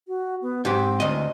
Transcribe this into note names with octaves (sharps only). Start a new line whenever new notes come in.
F#4
B3
G#2 C4 G4
D2 D#5